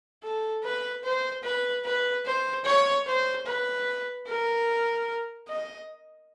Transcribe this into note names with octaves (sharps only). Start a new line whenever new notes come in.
A4
B4
C5
B4
B4
C5
C#5
C5
B4
A#4
D#5